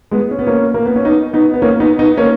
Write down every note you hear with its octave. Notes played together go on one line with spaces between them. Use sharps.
G#3 B3
C#4
B3
A#3 C#4
A#3
B3
C#4
B3 D#4
B3 D#4
B3
A#3 C#4
B3 D#4
B3 D#4
A#3 C#4